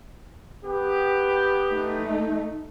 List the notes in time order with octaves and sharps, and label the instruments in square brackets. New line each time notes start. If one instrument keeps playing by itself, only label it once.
[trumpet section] B3 G4
[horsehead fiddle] A3 D#4